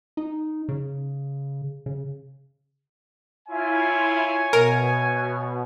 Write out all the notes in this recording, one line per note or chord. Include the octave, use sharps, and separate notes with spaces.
D#4
C#3
C#3
E4 F4 C#5 E5 G#5
B2 A#4